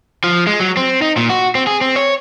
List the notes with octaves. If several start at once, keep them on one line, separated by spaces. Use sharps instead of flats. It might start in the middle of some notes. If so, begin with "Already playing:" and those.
F3
G#3
F#3
C4
D#4
A#2
F#4
C4
G#4
C4
C#5